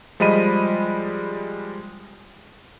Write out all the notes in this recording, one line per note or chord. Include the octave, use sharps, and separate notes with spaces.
F3 G3 G#3 D#5 B5 D#7